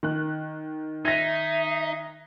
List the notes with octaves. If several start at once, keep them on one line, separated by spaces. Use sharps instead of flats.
D#3 F#6
D#4 E5 G#6 A#6